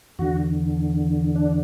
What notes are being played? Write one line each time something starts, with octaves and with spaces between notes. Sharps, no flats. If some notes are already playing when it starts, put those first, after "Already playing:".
E2 D3 F#4
D4